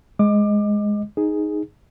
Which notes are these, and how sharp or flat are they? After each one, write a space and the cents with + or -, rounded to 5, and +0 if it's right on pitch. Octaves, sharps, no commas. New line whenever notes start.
G#3 +0 D#5 +0 D6 +25
D#4 +0 G#4 +0